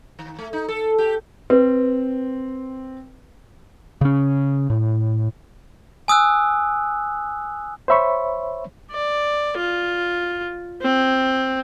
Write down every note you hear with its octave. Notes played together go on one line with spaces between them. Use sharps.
D#3
A3
D#4
A4
G4
C4 B4
C#3 C#4
A2
G#5 D#6 E6 F#6
C5 C#5 E5 B5 C#6
D5
F4
C4